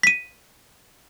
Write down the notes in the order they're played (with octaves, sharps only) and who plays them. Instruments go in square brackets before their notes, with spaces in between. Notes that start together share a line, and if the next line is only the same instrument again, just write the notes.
[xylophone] B6 D#7